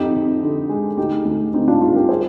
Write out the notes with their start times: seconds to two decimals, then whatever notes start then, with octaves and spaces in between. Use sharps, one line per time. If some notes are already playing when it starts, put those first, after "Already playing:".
Already playing: F2 D#4 G4
0.14 F2
0.42 D3
0.69 G#3
0.97 D2 D#4 G4
1.25 D2
1.54 D3 C4 D#4
1.68 D4 F4
1.81 G3 F4 G#4
1.95 G4 A#4
2.09 G#4 C5